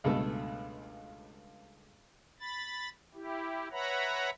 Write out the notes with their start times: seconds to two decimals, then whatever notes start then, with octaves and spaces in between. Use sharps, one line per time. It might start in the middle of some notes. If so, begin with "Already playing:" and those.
0.04 C#2 G2 B2 G#3 A3 A4
2.40 B5 A6
3.15 E4 G4
3.72 B4 C#5 E5 F#5 A#5 B5